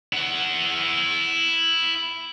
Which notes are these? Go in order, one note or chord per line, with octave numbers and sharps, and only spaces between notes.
E4 F#5